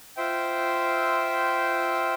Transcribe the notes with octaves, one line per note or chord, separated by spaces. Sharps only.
F4 C5 E5 G5